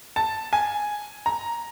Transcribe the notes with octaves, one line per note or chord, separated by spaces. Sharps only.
A5
G#5
A#5